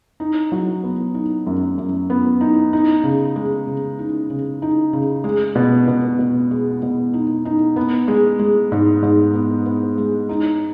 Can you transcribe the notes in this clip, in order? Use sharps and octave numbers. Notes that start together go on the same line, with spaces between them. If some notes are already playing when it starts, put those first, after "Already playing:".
D#4
F#3
B3
D#4
F#2
F#2
B3
D#4
D#4
C#3
G#3
C#3
D#4
C#3
D#4
C#3
G#3
B2
B2
B2
G#3
B2
D#4
D#4
B3
G#3
G#3
G#2
G#2
B3
B3
G#3
D#4